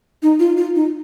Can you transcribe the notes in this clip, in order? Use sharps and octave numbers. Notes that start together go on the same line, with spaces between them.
D#4
F4
F4
D#4